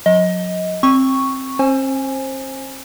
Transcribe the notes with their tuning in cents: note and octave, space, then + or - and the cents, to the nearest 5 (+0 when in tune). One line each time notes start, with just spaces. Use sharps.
F#3 -35 D#5 +20
C4 +15 C#6 +0
C4 +45 C5 +20 G#5 +0